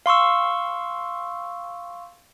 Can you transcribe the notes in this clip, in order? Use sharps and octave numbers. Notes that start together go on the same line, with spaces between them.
F5 C6 C#6 E6